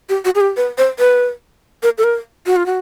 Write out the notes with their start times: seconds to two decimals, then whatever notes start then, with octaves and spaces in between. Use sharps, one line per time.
0.09 G4
0.25 F#4
0.35 G#4
0.41 G4
0.57 B4
0.78 C5
0.99 B4
1.83 A#4
1.98 A4
2.04 A#4
2.46 F#4
2.56 F4
2.66 F#4